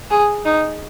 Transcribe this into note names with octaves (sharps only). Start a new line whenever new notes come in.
G#4
D#4